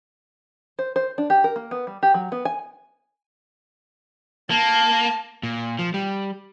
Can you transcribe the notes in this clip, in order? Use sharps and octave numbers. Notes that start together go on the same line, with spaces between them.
C5
C5
D4
G4
A#4
A#3
B3
G3
G4
F#3
B3
G#5
A#3 A5
A#2
F3
G3